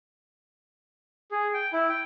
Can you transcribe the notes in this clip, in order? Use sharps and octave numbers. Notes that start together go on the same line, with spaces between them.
G#4
G5
E4
G5